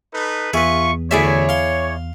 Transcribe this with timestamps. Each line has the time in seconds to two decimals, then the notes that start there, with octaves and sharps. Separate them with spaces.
0.13 D#4 A4 B4
0.53 E2 F4 G#4 B4 E5 C#6
1.11 A1 D2 E4 G#4 C#5 D5 E5
1.49 F5 C6